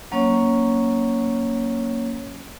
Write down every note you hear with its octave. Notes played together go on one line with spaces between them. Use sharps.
F#3 A#3 C#4 C#5